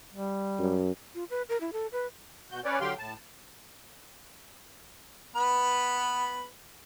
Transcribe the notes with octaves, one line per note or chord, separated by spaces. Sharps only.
G3
F#2
F4
B4
A#4
E4
A4
B4
B2 F#4 G6
C#4 B4 C#5 D5
D3 F#3 G4 F5 G5 C6
A2 A5
B3 B4